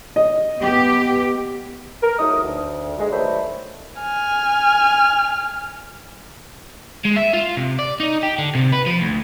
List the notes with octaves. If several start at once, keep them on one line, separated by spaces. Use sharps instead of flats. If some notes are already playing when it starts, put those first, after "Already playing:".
D#5
B3 G4
A#4
C#2 F#3 A3 D#4 D#6
D2
G#3
D#3 F#3 G3 A3 B4 C5
G#5 F6
G#3
E5
F4
C3
D5
D#4
G4
D3
C3
B4
F3
D2